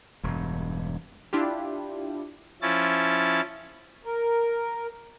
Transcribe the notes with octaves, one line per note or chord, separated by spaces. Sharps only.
E1 G2
D4 E4 F4 G4
F3 C#4 E4 A6
A#4